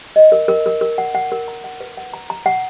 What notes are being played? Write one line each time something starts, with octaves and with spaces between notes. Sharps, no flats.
D#5
A#4
A#4
A#4
A#4
F#5
F#5
A#4
A#5
F#5
B4
F#5
A#5
A#5
F#5